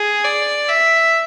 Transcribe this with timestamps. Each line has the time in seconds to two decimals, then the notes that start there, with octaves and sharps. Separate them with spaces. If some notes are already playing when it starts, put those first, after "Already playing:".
Already playing: G#4
0.24 D5
0.69 E5